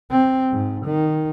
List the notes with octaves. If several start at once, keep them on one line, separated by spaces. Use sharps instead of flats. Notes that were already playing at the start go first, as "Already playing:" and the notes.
C4
G#2
D#3